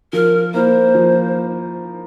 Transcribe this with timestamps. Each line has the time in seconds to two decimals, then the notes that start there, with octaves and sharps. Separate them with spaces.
0.13 F3 A#4
0.54 A#3 E4 C5
0.95 F3